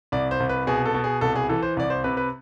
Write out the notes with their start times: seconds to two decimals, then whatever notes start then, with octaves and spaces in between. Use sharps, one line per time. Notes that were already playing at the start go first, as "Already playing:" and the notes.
0.12 C2 D5
0.31 C5
0.40 C2
0.49 B4
0.67 B2 G#4
0.86 A4
0.95 B2
1.04 G#4
1.21 C2 A4
1.35 G#4
1.49 E3 A4
1.62 C5
1.77 C2 D5
1.90 C5
2.04 C3 B4
2.17 B4